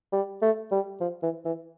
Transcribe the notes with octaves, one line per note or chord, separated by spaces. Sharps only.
G3
A3
G3
F3
E3
E3